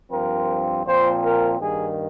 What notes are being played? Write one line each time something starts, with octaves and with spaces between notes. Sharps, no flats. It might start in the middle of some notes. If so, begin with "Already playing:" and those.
G2 F3 C4 A#4
A#2 F3 C4 C5
A#4
G2 D#3 A#3 G#4